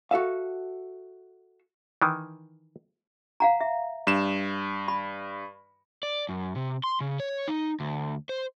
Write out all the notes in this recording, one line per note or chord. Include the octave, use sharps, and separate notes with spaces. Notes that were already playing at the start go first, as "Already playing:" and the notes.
F#4 A4 E5 F5
D#3 E3
F5 F#5 A#5
E5
G2 E7
B5
D5
F#2
C3
C6
C#3
C#5
D#4
D2
C5